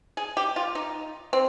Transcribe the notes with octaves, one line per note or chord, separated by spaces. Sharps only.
G#4
G4
F4
D#4
C4